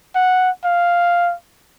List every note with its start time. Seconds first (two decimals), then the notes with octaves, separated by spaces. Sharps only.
0.16 F#5
0.64 F5